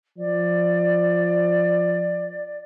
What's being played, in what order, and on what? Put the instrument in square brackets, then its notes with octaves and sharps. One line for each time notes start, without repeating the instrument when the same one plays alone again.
[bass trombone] F3 [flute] D5